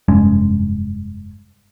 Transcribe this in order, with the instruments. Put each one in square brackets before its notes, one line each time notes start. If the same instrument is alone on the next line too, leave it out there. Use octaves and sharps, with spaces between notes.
[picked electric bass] F1 G2 G#3 C#4